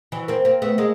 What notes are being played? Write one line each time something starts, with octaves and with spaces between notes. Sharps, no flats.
E3 F#3
A#3 C4
A#3 C4
A3 B3
G#3 A#3